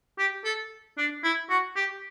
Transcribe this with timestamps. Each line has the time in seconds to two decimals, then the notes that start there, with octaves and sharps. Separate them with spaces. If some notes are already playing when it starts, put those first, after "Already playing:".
0.18 G4
0.44 A4
0.98 D4
1.24 E4
1.49 F#4
1.76 G4